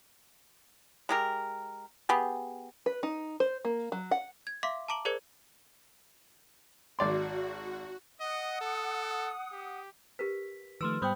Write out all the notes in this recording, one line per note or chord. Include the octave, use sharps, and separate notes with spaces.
G#3 G4 A#4
B3 G4 G#4
B4
D#4
C5
A#3
F#3
F#5
G#6
E5 F5 C6 D6 B6
A5 A#5 D6 D7 F#7
G#4 A#4 C5 D5 G#6 C#7
G#1 F#4 D5 C6
D#5 F#5 D#6
A4
G4
G4 A#4 B4 B6
D#3 F3 A3 B4 C6 E6 F6
G#2 G3 B3 C5 G5 B5 D#6 G6